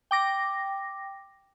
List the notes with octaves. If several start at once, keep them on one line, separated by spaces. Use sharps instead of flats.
G5 D6 A#6